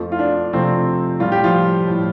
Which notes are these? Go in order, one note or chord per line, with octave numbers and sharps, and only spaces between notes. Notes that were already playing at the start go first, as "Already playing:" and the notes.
Already playing: F2 F3 A3
F4
D4
C3 F3 A3 C4
A2 G3 F4
G4
F3 F4
A2 G3